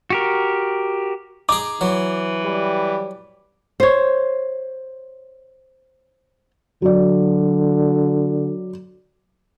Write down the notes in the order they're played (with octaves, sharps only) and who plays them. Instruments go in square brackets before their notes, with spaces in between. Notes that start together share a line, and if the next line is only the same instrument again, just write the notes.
[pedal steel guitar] F#4 G4 A#4
[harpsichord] D#4 G#4 [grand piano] D6
[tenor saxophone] E3 [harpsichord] F#3
[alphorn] G3
[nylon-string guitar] C5 C#5
[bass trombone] D3 [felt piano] F#3 D5